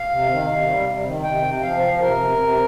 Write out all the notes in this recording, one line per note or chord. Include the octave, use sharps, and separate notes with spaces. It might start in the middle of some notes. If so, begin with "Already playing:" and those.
Already playing: F5
C3
D#3
C3
G3
C3
D#3
C3 G5
C3
F3 F5
F3
C3 A#4
C3
C3